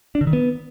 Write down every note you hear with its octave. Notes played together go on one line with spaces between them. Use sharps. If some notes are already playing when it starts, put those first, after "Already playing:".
D4
D3
D#3
B3